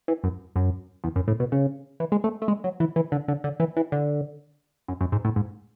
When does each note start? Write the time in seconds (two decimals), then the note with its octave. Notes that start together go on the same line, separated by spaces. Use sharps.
0.08 E3
0.24 F#2
0.56 F#2
1.04 E2
1.16 F#2
1.28 A2
1.40 B2
1.52 C#3
2.00 E3
2.12 G#3
2.24 A3
2.42 A3
2.48 G#3
2.64 F#3
2.80 E3
2.96 E3
3.12 D3
3.28 D3
3.44 D3
3.60 E3
3.77 E3
3.92 D3
4.88 F#2
5.01 F#2
5.12 G#2
5.25 A2
5.36 G#2